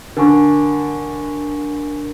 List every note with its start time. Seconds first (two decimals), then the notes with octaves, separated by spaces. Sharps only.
0.17 D3 A#4 G#5 C#6